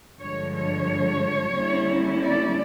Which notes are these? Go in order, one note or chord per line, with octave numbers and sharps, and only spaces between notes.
G2 D3 F3 G#3 C#5
C#5
D3 G3 A#3 C#4 E4
D5